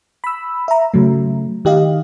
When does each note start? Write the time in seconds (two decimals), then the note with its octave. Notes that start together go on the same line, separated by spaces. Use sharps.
0.24 B5 E6
0.68 E5 A#5
0.94 C#3 F#3 A3
1.65 D#3 G4 D#5 F5